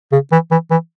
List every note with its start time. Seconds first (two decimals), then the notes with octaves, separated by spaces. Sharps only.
0.12 C#3
0.32 E3
0.51 E3
0.71 E3